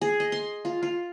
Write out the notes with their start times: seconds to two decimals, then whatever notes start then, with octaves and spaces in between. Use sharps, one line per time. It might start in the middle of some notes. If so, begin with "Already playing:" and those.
0.02 G#4
0.20 D#5
0.32 C6
0.65 F4
0.83 F4